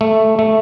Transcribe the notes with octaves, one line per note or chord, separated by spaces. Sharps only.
A3
A3